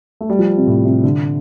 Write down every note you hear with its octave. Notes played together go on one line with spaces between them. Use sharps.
A3
G3
F3
C3
A2
C3
D3